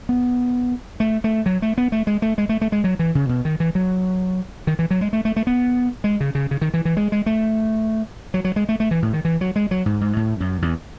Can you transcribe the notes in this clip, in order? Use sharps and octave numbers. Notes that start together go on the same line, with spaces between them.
B3
A3
A3
F#3
A3
B3
A3
G#3
A3
G#3
A3
A3
G#3
F#3
E3
C#3
B2
D#3
E3
F#3
D#3
E3
F#3
G#3
A3
A3
A3
B3
G#3
C#3
C#3
C#3
D#3
E3
E3
G#3
G#3
A3
F#3
F#3
G#3
A3
A3
E3
A2
D#3
E3
F#3
G#3
F#3
G#2
G#2
A2
F#2
E2